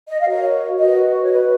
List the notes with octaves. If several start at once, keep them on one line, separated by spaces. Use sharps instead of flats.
D#5
F5
F#4 A#4 C#5 D#5
F#4 B4 D#5
C#5
F#4 B4 D#5